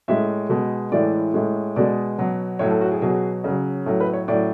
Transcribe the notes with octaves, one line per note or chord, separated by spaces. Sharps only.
A2 G#3 E5
B2 G#3
A2 E3 G#3 D5
A2 G#3
B2 G#3 D5
B2 F#3
A2 F#3 C#5
A4
F#4
G#4
B2 F#3 G#4
C#3 F#3
A2 F#3 A4
B4
C#5
A2 F#3 D5